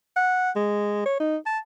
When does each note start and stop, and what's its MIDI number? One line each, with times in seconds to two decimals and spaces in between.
0.17 0.51 78
0.56 1.02 56
1.06 1.19 73
1.20 1.36 63
1.46 1.59 81